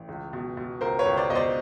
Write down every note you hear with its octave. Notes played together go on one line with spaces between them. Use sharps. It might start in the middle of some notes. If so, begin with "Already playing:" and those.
Already playing: A1
C#2
B2
B2
C#2 A#4 C5
B4 C#5
C#2
C5 D5
B2 D#5
C5 D5